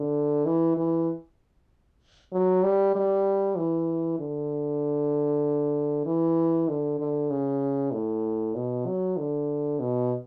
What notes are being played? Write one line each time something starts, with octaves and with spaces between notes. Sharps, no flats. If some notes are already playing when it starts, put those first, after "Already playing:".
Already playing: D3
E3
E3
F#3
G3
G3
E3
D3
E3
D3
D3
C#3
A2
B2
F#3
D3
B2